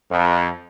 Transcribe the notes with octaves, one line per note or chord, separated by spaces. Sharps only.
F2